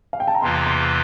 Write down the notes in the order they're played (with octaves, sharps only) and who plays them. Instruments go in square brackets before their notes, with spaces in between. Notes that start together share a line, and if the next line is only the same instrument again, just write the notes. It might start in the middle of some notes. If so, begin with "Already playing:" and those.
[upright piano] F5
G5
A5
A#5
[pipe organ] E2 C3 E3 A#3 F4 [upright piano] C6
[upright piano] C6